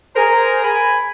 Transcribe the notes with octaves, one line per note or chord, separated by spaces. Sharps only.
G#4 A#4 C5 G#5 A#5
G#5 B5